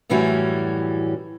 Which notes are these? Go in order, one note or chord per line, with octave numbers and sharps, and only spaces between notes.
F#2 A2 E3 G3 C#4 F#4